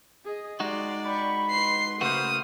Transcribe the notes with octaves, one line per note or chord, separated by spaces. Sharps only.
G#4 D#5
G#3 D#4 F#4 G4 D5 C6
G5 B5 C#6
B4 C6 C7
C#3 A3 A#3 F#4 B4 C5 D#6 F6